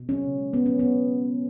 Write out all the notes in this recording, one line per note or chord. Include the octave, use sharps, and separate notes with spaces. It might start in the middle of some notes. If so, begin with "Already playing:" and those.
Already playing: B2
F#3 C#4
C#3
G#3
B2 B3
F#3 C#4
B2 B3